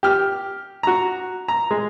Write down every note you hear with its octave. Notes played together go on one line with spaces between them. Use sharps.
G4 F6
F#4 A#5
A#5
G#3